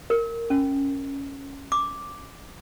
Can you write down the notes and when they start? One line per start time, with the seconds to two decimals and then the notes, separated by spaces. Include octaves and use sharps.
0.10 A#4
0.50 C#4
1.72 D6